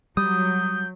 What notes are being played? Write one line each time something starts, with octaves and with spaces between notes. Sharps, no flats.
F#3 G3 D#6 G6